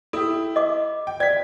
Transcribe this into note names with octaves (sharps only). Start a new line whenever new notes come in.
E4 G4 A4
D#5 D6
G5
D5 G#6 B6